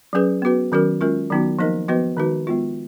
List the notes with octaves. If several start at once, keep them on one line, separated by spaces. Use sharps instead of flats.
F#3 C#4 G#4 B4
B3 F#4 B4
D#3 F#3 C#4 F#4 A#4
G#3 C#4 F4 A#4
D#3 F#3 B3 D#4 F#4
F3 A#3 D#4 A#4 D#5
F3 B3 F#4 B4 D#5
D#3 G#3 D#4 F#4 B4
G#3 B3 F4